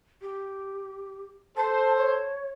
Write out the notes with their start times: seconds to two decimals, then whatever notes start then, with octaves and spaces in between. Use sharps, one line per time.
0.22 G4
1.57 A4 C5 A5
1.97 C#5